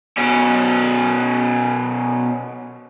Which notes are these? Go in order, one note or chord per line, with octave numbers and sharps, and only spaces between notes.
B2 C#4